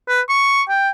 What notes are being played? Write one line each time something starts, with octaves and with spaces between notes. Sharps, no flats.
B4
C#6
G5